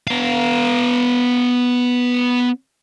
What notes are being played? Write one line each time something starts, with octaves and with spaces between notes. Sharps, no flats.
B3 F5